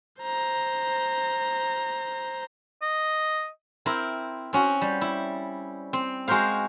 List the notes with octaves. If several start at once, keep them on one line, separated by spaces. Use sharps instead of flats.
C5 A#5
D#5
C4 E4 A#4
C4 C#4 F#4
G3
E4
C4
G#3 F#4 A#4 C5 F5